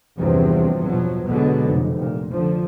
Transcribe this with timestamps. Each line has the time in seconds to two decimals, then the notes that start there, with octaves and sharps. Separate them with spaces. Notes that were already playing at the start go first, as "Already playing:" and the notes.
0.17 E2 G2 C3 F3 F#3 C4
0.82 B2 F3 F#3
1.28 B2 D3 F#3 G#3 B3
1.64 F1
1.99 A#2
2.32 D3 F3